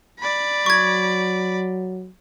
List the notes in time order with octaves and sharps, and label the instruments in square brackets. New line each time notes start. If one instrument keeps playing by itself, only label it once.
[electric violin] D5 B5
[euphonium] F#3 [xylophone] C#6 G#6